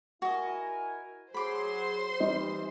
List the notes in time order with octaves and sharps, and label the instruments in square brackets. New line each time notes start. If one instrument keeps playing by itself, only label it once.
[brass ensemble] E4 A#4 G#5 [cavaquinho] F#4 D#5
[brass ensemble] F#3 G#4 [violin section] C5 C6 [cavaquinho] B5 D6
[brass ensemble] E3 [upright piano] G3 D#4